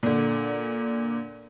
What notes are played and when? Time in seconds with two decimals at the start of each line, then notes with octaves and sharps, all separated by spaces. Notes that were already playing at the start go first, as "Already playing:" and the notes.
0.03 A#2 D3